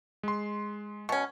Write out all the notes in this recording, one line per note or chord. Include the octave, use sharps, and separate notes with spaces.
G#3 C6
B2 C#4 C#6